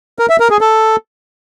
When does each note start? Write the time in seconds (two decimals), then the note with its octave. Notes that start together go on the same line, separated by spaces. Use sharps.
0.19 A#4
0.30 E5
0.40 A#4
0.50 G#4
0.61 A4